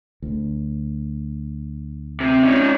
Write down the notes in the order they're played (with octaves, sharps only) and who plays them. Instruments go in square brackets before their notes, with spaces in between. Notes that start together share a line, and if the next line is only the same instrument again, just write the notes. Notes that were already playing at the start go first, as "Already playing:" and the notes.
[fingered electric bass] D2
[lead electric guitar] C3
C#4 D#4